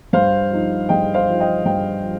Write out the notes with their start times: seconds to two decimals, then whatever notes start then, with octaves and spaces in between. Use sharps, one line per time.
0.13 G2 C5 F5
0.51 F3 D#4
0.89 G2 D#5 G5
1.14 C5 F5
1.28 F3 D#4
1.40 D#5 G5
1.65 G2 D#5 G5
2.03 F3